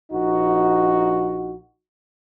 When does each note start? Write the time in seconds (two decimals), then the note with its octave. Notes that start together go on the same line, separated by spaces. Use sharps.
0.12 A#1 D#4 F#4